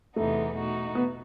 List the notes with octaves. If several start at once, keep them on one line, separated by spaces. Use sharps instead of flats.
E2 C3 E3 A3 B3 D#4
B2 A3 D#4 F#4
B3